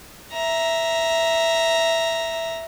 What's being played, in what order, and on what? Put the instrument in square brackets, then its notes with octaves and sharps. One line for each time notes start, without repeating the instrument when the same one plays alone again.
[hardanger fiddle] E5 A#5